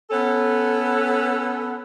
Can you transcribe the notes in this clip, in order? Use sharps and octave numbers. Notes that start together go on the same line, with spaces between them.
B3 C#4 A4